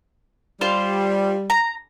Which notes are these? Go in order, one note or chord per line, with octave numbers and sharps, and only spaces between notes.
G3 F4 C5 C6
A#5